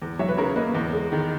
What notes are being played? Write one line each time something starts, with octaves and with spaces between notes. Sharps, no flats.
E2
F#3 C#5 E5
B4
C#3 A#4 C#5
A#3 B4 D#5
E2
G#3
D#3